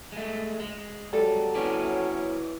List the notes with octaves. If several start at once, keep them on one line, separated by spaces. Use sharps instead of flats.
G#3 A3
G#3
C3 F#3 G3 A4
C#4 E4 B4 D5